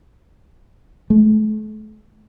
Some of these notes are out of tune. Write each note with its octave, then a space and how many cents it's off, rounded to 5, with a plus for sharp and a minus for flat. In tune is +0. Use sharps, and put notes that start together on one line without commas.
A3 -40